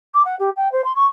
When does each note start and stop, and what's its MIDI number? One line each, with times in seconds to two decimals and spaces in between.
0.14 0.23 86
0.25 0.36 78
0.39 0.50 67
0.56 0.71 79
0.72 0.84 72
0.84 0.95 84
0.95 1.06 85